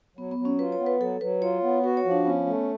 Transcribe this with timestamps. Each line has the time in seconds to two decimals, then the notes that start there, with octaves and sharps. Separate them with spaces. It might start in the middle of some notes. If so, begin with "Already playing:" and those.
0.17 F#3 B3
0.31 B3
0.38 F#3
0.45 C#4
0.59 F4 B4
0.72 C#5
0.80 B3
0.86 B4
1.00 F#3 A4
1.21 F#3 B4
1.42 F4 C#5
1.63 B3
1.84 F#4 B4
1.97 C#5
2.05 F3
2.11 D4
2.25 B3 C#4
2.46 A3